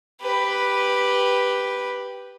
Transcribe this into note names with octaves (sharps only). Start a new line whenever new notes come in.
G4 B4